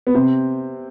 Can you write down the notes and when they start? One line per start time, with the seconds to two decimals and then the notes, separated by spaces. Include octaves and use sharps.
0.07 B3
0.15 C3 C4